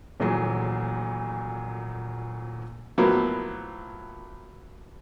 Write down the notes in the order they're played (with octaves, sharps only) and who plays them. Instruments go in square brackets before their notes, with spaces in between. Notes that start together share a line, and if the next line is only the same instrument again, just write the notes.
[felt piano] D#1 D2 A#2 E3 F#3 G#4
[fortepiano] A2 F3 F#3 A#3 B3